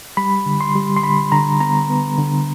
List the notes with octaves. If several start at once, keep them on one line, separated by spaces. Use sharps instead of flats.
G3 B5
D3
C6
G3
C6
D3 B5
D3 A#5
B3 A#5
B3
D3